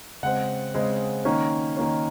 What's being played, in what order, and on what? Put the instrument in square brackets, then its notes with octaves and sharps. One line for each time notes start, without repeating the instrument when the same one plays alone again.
[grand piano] C#3 G#3 C4 F#5
C#3 G#3 C4
D#3 A#3 C#4
D#3 A#3 C#4